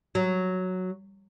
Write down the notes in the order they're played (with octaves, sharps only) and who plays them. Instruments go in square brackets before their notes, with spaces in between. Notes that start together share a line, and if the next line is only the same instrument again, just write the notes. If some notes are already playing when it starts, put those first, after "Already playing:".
[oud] F#3